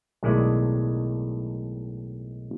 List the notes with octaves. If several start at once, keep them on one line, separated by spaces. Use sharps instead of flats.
B1 A2 D#3 G#3 E4 D5